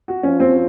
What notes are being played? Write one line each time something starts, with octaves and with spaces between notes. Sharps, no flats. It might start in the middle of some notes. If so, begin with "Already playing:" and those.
F#4
F3 C#4
C4